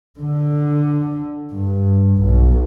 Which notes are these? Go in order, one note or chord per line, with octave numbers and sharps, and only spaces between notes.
D3
G2
B1